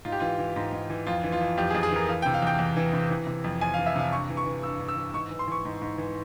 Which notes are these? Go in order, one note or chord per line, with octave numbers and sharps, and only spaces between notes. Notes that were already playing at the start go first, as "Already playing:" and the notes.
G#2 F4
G4
E3 F4
E3
G#2
G#2
E3
F2 F4
E3
F4
E3
F2 G4
G#4
F2
G#4
E3 A#4
E3 F5
C3 G5
F5
E2 G5
E2
E3
C3
E3
C3
F2
F2 G#5
F5
E3
E5
C3 F5
G2 C#6
E3
C#6
E3
G2 E6
G2
E6
E3
G#2 C#6
E3
C6
E3 C#6
G#2
G#2
E3